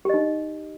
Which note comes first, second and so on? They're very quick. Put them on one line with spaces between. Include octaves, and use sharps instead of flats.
G4 D#5 D#4